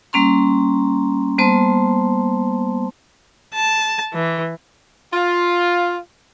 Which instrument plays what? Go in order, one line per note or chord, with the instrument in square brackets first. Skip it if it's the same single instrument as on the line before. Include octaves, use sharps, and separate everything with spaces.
[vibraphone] G3 A#3 C#4 A#5 C6
G3 A#3 B3 C5 A5 C6
[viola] A5
E3
[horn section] F4